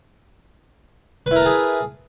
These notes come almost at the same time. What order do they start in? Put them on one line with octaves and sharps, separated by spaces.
B4 E4 A#4 A5 G#4